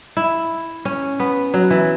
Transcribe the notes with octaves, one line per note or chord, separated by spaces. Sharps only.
E4
C#4
B3
F#3
E3